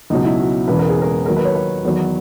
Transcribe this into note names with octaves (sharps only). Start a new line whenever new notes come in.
C#2 B2 F#3 D#4
E4
F#4
E1 E2 C#3 E3 B4
A#4
G#4
A#4
D#2 D#3 F#3 A#4
B4
C#5
B4
E2 D#3 F#3